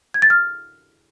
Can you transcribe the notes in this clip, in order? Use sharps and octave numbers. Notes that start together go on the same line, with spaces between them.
G#6
A6
F6